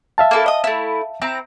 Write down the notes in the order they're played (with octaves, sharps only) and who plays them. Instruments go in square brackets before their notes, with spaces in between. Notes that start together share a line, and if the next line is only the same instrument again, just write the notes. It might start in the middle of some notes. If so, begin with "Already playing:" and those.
[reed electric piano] E5 F5 A5
[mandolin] A#3 E4 A4
D#5 D#6
A3 E4
C4 E4 A#5